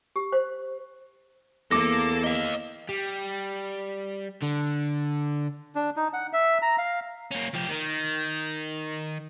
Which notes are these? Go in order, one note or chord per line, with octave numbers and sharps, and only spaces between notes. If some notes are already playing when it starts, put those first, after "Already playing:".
G4
C5
E2 A#3 A4 D6 A#6
D#5 F5
G3
D3
D4
D#4
F#5
E5
A#5
F5
A#3 C#4
F3 G4
D#3